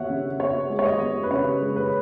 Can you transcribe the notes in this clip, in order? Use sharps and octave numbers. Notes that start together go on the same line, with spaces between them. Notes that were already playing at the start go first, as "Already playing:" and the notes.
Already playing: B3 C#5 E5 F#5
C#3
B3 C#5
G#3
C#5
D#5
B3
B4
C#3 C#5
G#3
B4